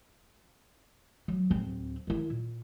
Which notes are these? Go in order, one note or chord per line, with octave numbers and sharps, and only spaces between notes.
F#3
D1 C4
D#3 E4
A#2